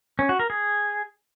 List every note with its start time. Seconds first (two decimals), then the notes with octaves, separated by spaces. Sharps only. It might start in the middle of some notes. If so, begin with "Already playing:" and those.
0.19 C#4
0.29 F#4
0.39 A#4
0.50 G#4